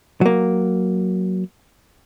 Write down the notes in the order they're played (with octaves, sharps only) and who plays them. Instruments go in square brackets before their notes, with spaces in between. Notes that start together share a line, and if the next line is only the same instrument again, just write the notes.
[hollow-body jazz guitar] F#3 A#3